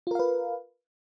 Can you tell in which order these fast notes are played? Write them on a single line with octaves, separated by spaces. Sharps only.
F4 A#4 F5 B4